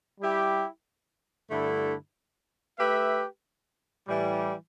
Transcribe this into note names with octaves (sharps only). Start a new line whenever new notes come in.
G3 E4 G4
G2 D3 A3 E4
A3 G4 B4 E5
A2 E3 G3